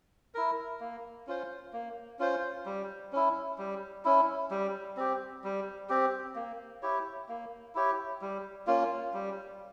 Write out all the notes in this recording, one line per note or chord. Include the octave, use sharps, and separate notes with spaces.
E4 A#4
A#3
C#4 F4 C5
A#3
C#4 F4 C5
G3
C#4 E4
G3
C#4 E4
G3
C4 G4
G3
C4 G4
A#3
E4 G4 C#5
A#3
E4 G4 C#5
G3
A#3 C#4 F4
G3